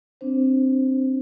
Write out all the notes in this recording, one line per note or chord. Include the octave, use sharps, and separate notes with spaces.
C4 D4 C5